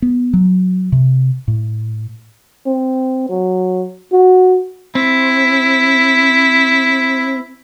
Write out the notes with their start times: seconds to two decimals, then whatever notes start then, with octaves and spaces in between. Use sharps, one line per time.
0.02 B3
0.33 F#3
0.92 C3
1.48 A2
2.66 C4
3.29 F#3
4.12 F#4
4.95 C4 E4